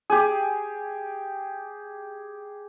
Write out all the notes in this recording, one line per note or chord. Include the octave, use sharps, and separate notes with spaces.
G4 G#4